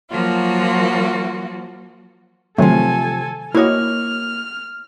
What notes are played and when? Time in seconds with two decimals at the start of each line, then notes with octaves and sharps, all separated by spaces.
0.11 F3 F#3 A#3 F4 F#4
2.58 C3 D#3 F3 F#3 A3 A4 G#5
3.55 A#3 E4 F#4 C#5 D#5 F6